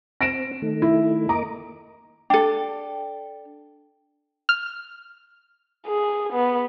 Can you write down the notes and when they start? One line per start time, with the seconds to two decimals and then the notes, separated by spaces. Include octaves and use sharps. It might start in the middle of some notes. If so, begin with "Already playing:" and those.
0.21 C4 A#6 D7 E7
0.62 D#3 A3
0.82 E4
1.29 A#3 D#5 A#5 D6
2.30 D4 A4 G5
4.49 F6
5.86 G#4
6.33 B3